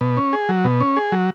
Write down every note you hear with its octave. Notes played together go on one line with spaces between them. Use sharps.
B2
C#4
G#4
F#3
B2
C#4
G#4
F#3